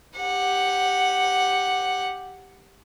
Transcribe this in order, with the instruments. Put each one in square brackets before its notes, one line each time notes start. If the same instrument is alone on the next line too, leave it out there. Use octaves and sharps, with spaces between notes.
[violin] G4 F#5